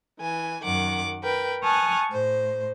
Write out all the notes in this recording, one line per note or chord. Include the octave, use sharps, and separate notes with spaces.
E3 G#5
F#2 D#3 F#5 D6
A#4 B4 G5
G#5 A5 C#6 D#6 F6 F#6
A2 C5